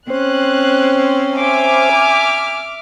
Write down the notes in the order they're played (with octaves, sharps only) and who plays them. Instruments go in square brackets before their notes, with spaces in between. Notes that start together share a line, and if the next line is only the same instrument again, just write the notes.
[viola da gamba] C4 C#4 [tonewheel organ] C5 [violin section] F#6
[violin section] E5 D6 F6 [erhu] G#5